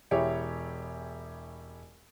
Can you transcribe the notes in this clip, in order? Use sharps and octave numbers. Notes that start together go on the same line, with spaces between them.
E1 E4 G4 G#4 C#5 E5